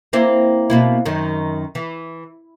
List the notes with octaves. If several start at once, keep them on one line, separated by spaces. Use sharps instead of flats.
A#3 C4 E4
B2 A#3 E4
F#2 D#3
E3